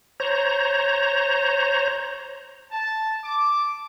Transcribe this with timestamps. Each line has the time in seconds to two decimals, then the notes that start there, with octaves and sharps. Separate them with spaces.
0.20 C5 C#5 A#5
2.72 A5
3.24 D6